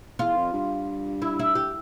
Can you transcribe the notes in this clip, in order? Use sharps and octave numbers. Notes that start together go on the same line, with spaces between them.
E2 F4
F2
G2
E4
E4
G4